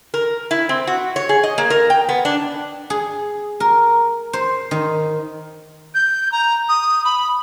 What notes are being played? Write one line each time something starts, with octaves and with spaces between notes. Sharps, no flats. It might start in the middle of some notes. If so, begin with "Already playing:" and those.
A#4
E4
C4
F#4
C#5
G#4
D#5
A#3
A#4
G5
B3
D4
G#4
A#4
C5
D#3
G6
A#5
D#6
B5